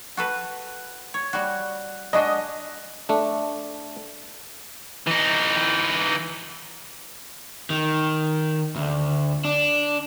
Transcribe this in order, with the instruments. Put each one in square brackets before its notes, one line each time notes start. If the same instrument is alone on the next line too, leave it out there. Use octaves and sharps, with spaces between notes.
[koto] F#4 A4 B4
C#5
G3 F#4
[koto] G#3 D4 F#4 [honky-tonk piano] D#5
[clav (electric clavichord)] A3 D4
[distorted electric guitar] E3 D#4
[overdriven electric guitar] D#3
D2
D4